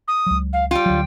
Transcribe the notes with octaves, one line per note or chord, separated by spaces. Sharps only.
D#6
C#2 F#3
F5
G3 F4 G5
D2 F#3